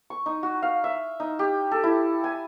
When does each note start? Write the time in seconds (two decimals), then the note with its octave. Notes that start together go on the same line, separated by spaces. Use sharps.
0.10 C#6
0.26 D#4
0.43 F#4
0.62 F5
0.84 E5
1.20 D#4
1.39 G4
1.71 A4
1.84 E4
2.24 G#5